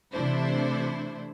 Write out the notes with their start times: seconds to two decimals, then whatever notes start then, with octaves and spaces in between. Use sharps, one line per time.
0.13 C3 E3 A3 D4 E4 C5